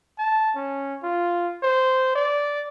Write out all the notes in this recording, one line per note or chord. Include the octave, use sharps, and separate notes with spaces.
A5
C#4
F4
C5
D5